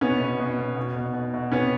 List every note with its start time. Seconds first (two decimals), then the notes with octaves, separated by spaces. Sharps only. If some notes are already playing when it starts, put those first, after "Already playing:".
0.01 B2 B3 C#4
0.20 B2
0.40 B2
0.59 B2
0.76 B2
0.96 B2
1.14 B2
1.34 B2
1.52 C3 B3 C#4